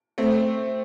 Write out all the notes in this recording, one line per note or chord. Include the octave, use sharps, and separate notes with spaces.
A3 C4